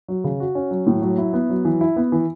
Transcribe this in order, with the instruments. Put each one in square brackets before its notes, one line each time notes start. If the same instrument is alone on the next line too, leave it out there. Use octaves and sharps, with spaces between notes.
[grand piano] F#3
C#3
F#4
C#4
F#3
A2
F#3
E4
B3
F#3
E3
E4
B3
E3